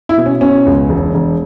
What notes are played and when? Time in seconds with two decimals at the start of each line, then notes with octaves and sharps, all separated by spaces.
0.09 E4
0.17 B2
0.26 C#4
0.41 B2 C#4
0.66 C#2
0.89 E1
1.14 E1